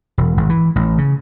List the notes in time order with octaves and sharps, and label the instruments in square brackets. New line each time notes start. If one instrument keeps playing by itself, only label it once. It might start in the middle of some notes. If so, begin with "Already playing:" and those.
[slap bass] E1
G#1
E3
A1
C#3